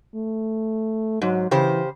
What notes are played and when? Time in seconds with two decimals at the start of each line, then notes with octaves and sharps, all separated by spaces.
0.15 A3
1.22 G#2 F#3
1.51 C#3 E3 G4 C5